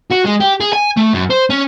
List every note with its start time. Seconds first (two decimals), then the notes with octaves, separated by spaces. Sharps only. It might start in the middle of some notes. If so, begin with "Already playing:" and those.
0.11 F#4
0.25 G#3
0.40 G4
0.60 G#4
0.73 G#5
0.97 A3
1.13 F#2
1.30 C5
1.50 C#4